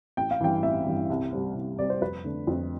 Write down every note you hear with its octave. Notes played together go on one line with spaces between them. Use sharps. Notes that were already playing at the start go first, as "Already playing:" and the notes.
A1 G5
F5
G2 E3 G5
A1 E5
G2 E3
C2
C3 G3 C4
C2
C3 G3 C4 D5
C5
F2 B4
D3 A3 D4
F2